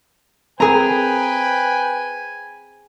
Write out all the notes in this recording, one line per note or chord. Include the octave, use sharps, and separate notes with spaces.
C4 G#4 A#4 B4 G5 G#5 A#5